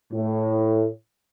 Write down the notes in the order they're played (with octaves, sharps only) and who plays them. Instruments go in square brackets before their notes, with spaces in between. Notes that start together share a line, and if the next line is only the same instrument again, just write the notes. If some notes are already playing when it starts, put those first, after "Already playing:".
[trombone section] A2